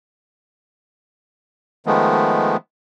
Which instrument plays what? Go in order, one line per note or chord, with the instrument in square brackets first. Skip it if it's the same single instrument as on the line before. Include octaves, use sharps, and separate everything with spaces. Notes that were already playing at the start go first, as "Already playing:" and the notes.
[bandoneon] D#3 F3 G#3 A3 B3